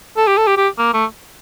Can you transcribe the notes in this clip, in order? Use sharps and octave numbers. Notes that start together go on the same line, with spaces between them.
A4
G4
A4
G4
G4
A#3
A3